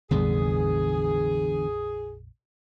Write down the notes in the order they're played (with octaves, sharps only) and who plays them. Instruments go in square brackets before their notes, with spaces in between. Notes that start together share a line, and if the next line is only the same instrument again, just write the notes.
[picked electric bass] F1 A#1 G3 [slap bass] D3 E3 B3 [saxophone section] G#4